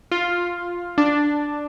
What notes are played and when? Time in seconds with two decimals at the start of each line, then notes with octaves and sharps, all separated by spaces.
0.12 F4
0.98 D4